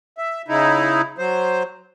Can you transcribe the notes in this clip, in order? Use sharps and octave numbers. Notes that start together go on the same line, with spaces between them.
E5
C#3 D#4 E4
F#3 C5